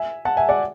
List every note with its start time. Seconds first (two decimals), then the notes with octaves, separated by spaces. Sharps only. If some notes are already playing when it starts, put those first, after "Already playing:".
Already playing: E5 G#5
0.25 F#5 A5
0.37 E5 G#5
0.49 D5 F#5